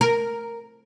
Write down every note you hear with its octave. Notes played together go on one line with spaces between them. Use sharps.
A#4